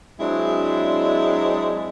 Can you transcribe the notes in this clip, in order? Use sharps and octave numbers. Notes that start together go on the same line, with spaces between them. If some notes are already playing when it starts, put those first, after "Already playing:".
F#3 G#3 C4 D4 E4